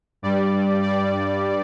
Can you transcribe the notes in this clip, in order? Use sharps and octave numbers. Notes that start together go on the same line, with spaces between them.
G2 G3 D5
D5